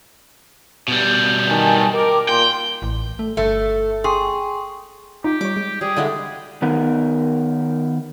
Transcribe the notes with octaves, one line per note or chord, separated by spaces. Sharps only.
B2 G3
D#3 G#5 A5
A#4 G5 D6
A#2 G5 C6
A1
A3
G1 A3
G#4 G5 C6 C#6
D#4 F4 G4
G3 C#5 D6
G#3
G3 G#4
D3 G#3 E4 D#5 F5 F#5
D#3 B3 D#4 A#4